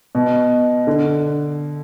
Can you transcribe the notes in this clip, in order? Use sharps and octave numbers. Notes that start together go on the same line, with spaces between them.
B2
D3